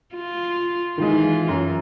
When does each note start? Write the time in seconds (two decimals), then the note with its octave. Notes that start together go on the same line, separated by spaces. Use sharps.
0.15 F4
0.98 D#3 E3 G#3 F4
1.48 F#2